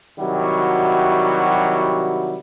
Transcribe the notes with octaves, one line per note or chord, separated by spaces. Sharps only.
C3 D#3 F#3 G3 E4 F#4